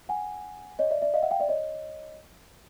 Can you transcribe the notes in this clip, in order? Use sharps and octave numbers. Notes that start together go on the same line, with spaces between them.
F#5 G#5
C#5 D#5
D5 E5
D5 E5
D#5 F5
E5 F#5
F5 G5
D5 E5
C#5 D#5